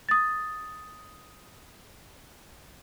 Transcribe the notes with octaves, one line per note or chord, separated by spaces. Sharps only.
D#6 A6